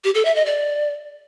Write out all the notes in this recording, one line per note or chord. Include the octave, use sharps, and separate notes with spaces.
G4
A4
E5
D#5
D5